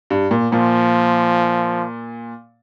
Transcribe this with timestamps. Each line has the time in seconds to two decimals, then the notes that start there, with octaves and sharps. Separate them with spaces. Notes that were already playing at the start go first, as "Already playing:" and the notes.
0.10 G2
0.31 A#2
0.52 A#2 F3